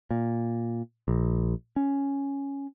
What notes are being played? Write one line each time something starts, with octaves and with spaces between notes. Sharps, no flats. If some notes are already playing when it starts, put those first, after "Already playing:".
A#2
A#1
C#4